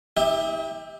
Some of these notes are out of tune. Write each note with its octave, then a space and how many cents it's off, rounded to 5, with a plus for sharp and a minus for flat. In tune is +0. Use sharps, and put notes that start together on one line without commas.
E4 -45 G4 +25 E5 +0